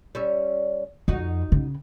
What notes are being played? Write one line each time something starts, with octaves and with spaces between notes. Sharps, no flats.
G3 C#4 E5
F2 D#4 F#4
C#3